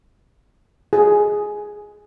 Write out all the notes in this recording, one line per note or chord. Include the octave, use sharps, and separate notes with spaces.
G#4